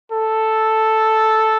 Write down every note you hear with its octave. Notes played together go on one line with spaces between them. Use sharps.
A4